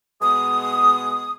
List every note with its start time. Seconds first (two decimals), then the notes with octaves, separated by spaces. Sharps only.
0.21 B2 G#3 B3 D#6